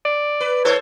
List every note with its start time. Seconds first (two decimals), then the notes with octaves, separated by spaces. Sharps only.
0.05 D5
0.40 B4
0.65 E3 A4 C5 C#5